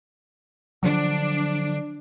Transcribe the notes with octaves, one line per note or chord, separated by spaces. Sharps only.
D3 F3 F#3 D4